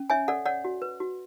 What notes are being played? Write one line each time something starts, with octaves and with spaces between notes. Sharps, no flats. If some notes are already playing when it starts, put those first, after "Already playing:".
Already playing: C#4
C#5 E5 G#5
A4 D5 F#5
C#5 D5 F#5
F#4
B4
F#4